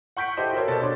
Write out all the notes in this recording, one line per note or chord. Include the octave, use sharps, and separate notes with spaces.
F#5 C#6 G6 B6 D7
E4 G4 A4 C5 D#5
F#4 A4 A#4 C5 C#5
B2 A#3 A4 D5 A6
D4 C#5 C6